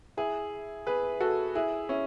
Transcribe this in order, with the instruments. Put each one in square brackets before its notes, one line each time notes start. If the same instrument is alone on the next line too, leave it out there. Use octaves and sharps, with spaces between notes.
[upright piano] E4 G#4
G#4 B4
F#4 A4
E4 G#4
C#4 E4